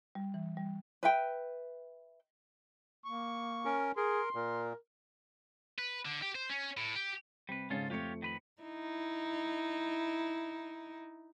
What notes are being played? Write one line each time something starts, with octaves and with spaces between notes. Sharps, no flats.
G3
E3
G3
B4 E5 G5
A#3 C#6
C#4 A#4
G#4 A#4 C6
A#2 A#4
B4
D3
G4
C5
C#4
A2
G4
C3 G3 B4
G#2 C#3 C#4 F4 A4
F2 A3 F4 G4 C#5 C#7
D#3 B4 B5
D#4 E4